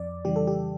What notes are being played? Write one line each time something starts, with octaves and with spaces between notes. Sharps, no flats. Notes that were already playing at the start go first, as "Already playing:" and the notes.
Already playing: F2 D5
C#3 E3 G3 G4
A4
G4